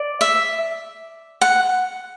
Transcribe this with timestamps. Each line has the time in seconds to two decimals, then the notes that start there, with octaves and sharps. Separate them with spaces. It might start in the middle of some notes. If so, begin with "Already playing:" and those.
Already playing: D5
0.21 E5
1.41 F#5